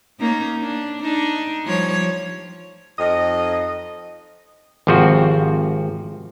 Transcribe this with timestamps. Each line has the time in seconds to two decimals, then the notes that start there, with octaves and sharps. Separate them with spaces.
0.20 A#3 C#4 D#4
0.62 D4
1.01 D4 D#4
1.65 F3 G3 C#5
2.99 F2 D#4 D#5
4.87 G#1 C3 F3 C4 F#4